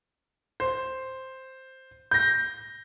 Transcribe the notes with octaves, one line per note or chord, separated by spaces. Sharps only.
C5
G6 A#6